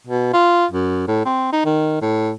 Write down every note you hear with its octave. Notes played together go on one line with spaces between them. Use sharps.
B2
F4
F#2
A2
C4
D#4
D#3
A2